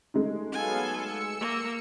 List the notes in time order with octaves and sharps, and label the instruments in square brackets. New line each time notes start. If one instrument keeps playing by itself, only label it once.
[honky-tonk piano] G#3 A3 D#4
[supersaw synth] F#3 B3 F5 [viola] A4 G#5
[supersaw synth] E6 C#7
[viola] A#3